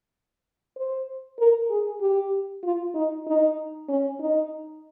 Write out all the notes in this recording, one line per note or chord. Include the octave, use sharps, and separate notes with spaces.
C5
A#4
G#4
G4
F4
D#4
D#4
C#4
D#4